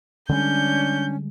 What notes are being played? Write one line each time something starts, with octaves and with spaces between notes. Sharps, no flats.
D3 G3 G#3 C#4 D4 G6